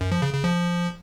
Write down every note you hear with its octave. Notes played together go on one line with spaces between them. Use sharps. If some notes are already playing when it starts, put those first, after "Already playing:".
F#2
F3
C#3
C#3
F3